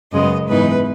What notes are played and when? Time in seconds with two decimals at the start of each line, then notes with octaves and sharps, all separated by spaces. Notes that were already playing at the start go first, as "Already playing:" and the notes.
0.11 F#2 C#3 G#3 B3 D#5
0.47 G#2 E3 B3 D#4 B4